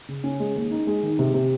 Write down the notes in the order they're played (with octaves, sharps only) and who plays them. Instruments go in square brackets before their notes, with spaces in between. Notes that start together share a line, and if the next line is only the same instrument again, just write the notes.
[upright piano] C#3
C#4
G#3
D#2
D#4
G#3
D#3
C3
C3